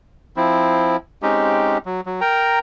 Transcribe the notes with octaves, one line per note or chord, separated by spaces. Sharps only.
F3 C4 E4
G#3 C4 C#4 D#4 G4
F#3
F#3
A#4 G5 A#5